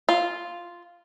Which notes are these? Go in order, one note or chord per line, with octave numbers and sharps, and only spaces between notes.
F4